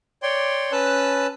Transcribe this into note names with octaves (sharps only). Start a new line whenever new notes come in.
C#5 D5 G5 C6
C#4 B4 A5 E6 F#6